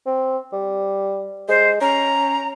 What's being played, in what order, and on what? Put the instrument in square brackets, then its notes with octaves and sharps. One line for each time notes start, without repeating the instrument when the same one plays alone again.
[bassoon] C4
G3
[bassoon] G#3 [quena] C5
[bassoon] C#4 [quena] A#5